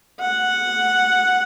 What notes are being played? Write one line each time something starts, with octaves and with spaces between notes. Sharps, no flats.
F#5